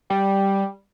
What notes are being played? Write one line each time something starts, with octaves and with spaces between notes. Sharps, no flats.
G3 G4